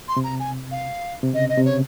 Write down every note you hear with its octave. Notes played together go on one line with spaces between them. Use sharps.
C6
C3
A#5
G#5
F5
C3
C#3 D#5
D#5
C3
C#3 C#5